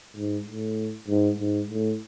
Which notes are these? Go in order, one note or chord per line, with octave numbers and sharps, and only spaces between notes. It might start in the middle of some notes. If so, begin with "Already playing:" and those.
G#2
A2
G#2
G#2
A2